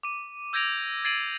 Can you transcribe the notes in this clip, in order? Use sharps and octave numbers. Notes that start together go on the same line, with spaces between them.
D6 D#7
E6 G6 G#6 A#6 D7 F7
G#6 A6 C7 D7 D#7 F#7